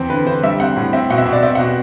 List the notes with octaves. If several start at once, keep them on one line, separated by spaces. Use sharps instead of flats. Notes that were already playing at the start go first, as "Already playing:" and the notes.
Already playing: E2 C4
D3 B4
D3 C5
G3 E5
C4 F#5
A2
C4 E5
B2 F#5
E5
B2
D5
C4 E5
F#5
B2